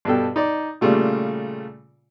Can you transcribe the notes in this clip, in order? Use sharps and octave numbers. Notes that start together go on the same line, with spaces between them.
G2 B2 A4 G5
D#4 D5
A#2 C#3 G3 A3 F4